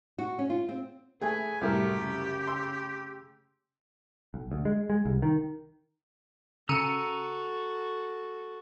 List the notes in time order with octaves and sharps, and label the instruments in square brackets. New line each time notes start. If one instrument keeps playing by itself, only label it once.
[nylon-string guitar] F#4
C#4
F4
C4
[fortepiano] A3 G#4 [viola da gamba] B4 [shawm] G#5
[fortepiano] C2 E4 A#4 [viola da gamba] F#2 A2 A3 [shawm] G4
[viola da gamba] C#3
[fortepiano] C6 E6
[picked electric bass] B1
D2
G#3
G#3
C2
D#3
[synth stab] C#3 C#7 D#7 [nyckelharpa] F#4 A4 [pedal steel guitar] A#5 E6